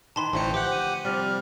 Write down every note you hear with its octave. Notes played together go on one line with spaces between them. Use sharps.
D#3 E3 A5 B5 C6
A1 D3 E3 F3 A3 G5 C#7
G4 C5 F#5
D#7
C3 F3 G3 D4 F6